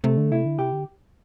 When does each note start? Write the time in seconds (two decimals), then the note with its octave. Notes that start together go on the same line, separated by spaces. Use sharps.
0.04 C3 A3
0.17 D3
0.32 C3 E4
0.46 D3
0.58 C3 G4
0.73 D3